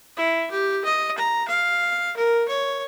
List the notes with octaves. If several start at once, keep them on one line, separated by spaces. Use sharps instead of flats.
E4
G4
D#5
A#5
F5
A#4
C#5